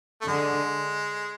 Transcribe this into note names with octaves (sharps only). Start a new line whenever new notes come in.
A3
D3 G#3